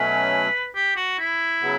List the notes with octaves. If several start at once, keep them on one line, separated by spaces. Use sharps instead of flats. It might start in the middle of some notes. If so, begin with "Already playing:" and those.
Already playing: B2 F#3 A3 C#4 B4
G4
F#4
E4
C#3 F#3 B3